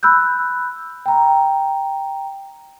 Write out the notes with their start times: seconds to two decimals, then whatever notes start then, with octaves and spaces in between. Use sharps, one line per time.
0.03 B5 E6 F#6 G6
1.06 G5 A#5